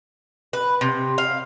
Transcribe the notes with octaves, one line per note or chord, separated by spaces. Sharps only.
B4
C3
F5